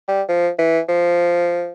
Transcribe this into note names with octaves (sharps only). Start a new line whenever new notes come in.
G3
F3
E3
F3